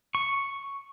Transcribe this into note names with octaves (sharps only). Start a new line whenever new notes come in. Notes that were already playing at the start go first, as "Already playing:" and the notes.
C#6